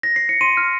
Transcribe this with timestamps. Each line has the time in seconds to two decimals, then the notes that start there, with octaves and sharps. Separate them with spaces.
0.03 A#6
0.16 C7
0.29 C#7
0.41 C6 D#7
0.57 F6